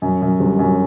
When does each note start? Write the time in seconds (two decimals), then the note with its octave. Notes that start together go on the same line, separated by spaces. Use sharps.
0.02 F#2
0.22 F#2
0.40 G1
0.59 F#2